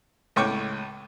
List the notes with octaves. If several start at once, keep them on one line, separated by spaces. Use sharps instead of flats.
C#2 A2 G5 C#6 D6